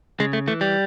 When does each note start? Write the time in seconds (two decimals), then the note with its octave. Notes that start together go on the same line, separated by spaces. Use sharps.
0.20 C#3 G#3
0.33 A3
0.47 E3 A3
0.61 G3